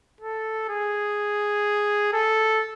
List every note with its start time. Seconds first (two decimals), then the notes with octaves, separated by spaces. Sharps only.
0.21 A4
0.69 G#4
2.13 A4